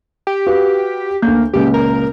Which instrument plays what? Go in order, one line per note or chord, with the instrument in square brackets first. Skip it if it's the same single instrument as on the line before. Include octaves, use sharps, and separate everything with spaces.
[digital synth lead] G4
[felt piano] F#4 B4 F5
[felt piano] D2 A3 G6 [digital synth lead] A#3
[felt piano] C#2 A#2 C#3 [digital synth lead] G4
[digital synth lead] A#4